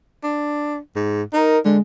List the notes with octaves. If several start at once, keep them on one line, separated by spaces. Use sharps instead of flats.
D4
G#2
D#4 A#4
D3 G#3